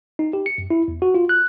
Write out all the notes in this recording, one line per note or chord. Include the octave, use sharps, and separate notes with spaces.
D#4
G4
C#7
F#2
E4
E2
F#4
F4
F#6